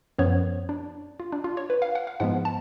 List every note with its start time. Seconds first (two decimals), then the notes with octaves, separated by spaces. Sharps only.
0.18 F#2 F3 B3 C#5
0.69 D4
1.20 F4
1.32 D4
1.44 F4
1.57 C#5
1.70 B4
1.82 F5
1.95 F#5
2.07 F5
2.20 G#2 F3 G#3 B3 F#5
2.45 A5